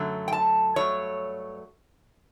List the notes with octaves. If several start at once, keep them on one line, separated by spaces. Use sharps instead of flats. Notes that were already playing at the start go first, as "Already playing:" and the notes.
Already playing: F#2 D3 F#3 A3
G5
A5
G2 F#3 A3 C#5